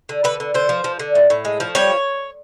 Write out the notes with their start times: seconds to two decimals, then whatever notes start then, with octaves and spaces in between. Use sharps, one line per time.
0.09 D3
0.24 D3 B4
0.40 D3
0.54 D3 C5
0.69 F3
0.84 F3
1.00 D3
1.15 A2
1.30 A2
1.45 G#3
1.60 F3
1.75 G3 C#5